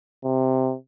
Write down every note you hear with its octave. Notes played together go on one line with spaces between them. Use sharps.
C3